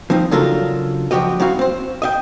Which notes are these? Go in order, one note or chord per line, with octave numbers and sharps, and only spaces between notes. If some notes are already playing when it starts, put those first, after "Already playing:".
F3 C4 D#4
C#3 F#3 D4 F4 A4 A#4
F#2 F3 F#4 G4 D#5
F#3 C4 E4 F#4 F5
C4 C5
D#5 E5 G5